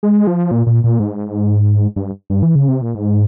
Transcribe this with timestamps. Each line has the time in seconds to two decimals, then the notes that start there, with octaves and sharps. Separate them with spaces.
0.03 G#3
0.27 F3
0.51 A#2
0.67 A#2
0.84 A#2
1.00 G#2
1.96 G2
2.30 G2
2.43 E3
2.55 C#3
2.68 C3
2.82 A#2
2.95 G#2